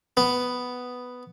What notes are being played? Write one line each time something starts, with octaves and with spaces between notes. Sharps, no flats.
B3